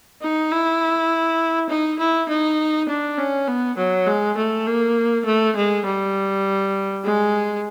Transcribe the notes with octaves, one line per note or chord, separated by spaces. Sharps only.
D#4
E4
D#4
E4
D#4
D4
C#4
B3
F#3
G#3
A3
A#3
A3
G#3
G3
G#3